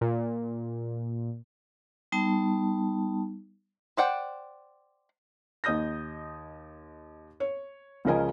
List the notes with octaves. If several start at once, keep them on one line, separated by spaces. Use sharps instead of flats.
A#2
G3 B3 D#4 A5
C5 D5 F#5 G5
D#2 D#5 D#6 G6 A#6
C#5
C#2 C#3 F3 A#4 D#5 G#5